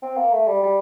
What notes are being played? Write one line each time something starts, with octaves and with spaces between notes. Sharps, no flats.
C4
A#3
A3
G3
G3